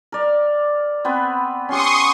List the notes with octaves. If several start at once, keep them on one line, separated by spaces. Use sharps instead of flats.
A#4 D5
B3 C4 B4
C#4 G4 C6 C#6 D#6